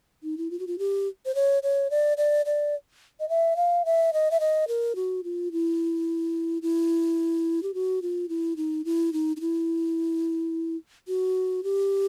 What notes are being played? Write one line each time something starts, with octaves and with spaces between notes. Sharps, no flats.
D#4
E4
F4
F#4
F4
G4
C5
C#5
C#5
D5
D5
D5
D#5
E5
F5
E5
D#5
E5
D#5
A#4
F#4
F4
E4
E4
G4
F#4
F4
E4
D#4
E4
D#4
D#4
E4
F#4
G4